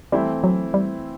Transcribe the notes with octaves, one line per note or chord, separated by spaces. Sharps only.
E3 G3 A3 C4 E4
F#3
G3